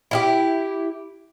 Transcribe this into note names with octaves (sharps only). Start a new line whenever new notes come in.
E4 F4 G4